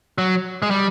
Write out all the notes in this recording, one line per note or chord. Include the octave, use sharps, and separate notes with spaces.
F#3
G#3
G3